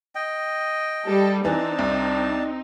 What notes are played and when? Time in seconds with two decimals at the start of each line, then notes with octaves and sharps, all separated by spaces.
0.15 D#5 G5
1.06 G3 A4
1.45 E3 C4 D4 D#4 A5
1.79 C2